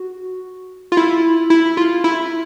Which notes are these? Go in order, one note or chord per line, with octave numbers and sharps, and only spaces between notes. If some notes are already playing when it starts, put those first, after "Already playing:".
Already playing: F#4
F4
E4
E4
F4
E4